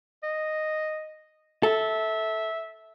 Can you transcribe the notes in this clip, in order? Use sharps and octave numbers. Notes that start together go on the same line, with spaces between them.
D#5
A4 E5